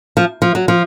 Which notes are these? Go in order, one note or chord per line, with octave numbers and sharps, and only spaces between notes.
F3
F3
F#3
F3